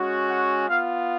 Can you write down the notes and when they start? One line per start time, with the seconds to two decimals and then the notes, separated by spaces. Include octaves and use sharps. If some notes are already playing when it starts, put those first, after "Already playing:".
Already playing: G#3 C#4 F#4
0.29 F#5
0.68 B3 F4 F5